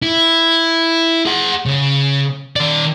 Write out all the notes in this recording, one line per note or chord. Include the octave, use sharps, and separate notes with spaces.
E4
G#4 F#5
C#3
D#3 D5